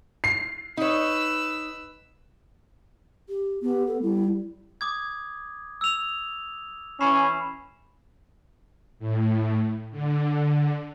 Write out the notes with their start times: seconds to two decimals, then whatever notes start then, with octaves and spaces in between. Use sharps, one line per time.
0.24 C7
0.77 D#4 B4 C#5 E6
3.29 G4
3.63 B3 G4
3.87 A4
4.02 G3 E4
4.81 D6 D#6 G#6
5.81 E6 F7
7.01 E3 C#4 B5 C7 E7
8.99 A2
9.91 D3